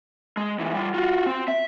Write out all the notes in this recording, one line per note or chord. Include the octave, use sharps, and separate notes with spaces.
G#3
D2 E3
G3 F4
F4 F#4
C4
E5